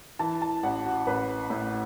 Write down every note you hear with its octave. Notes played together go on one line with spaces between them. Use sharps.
E3 A5
A5
A1 F#5
F#4
A1 B4
A2